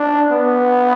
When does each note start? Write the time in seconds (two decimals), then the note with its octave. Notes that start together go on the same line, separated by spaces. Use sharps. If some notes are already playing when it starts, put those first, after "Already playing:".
Already playing: D4
0.32 B3